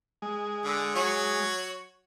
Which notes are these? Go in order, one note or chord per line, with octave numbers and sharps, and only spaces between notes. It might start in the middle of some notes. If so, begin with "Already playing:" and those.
G#3
D3
F#3 F#4 C#5